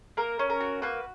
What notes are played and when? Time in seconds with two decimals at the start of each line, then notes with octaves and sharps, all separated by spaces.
0.17 A#3 A#4
0.39 C#4
0.50 A#4
0.60 F#4
0.82 A#3 B4